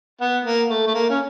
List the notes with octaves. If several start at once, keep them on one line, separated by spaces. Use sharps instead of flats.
B3
A#3
A3
A3
A#3
C#4